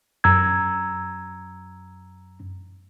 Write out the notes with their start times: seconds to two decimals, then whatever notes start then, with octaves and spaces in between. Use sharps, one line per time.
0.24 F#2 A#5 E6 G#6